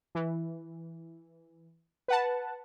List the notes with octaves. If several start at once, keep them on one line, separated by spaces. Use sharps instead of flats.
E3
B4 F#5 A5